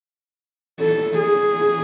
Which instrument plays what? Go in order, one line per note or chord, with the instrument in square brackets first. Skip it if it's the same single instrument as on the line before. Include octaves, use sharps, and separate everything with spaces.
[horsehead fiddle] A4
G#4